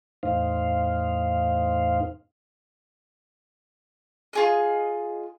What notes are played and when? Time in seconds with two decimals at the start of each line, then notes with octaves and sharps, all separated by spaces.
0.23 E2 A2 D#4 C5 F5
4.33 F4 G#4 D#5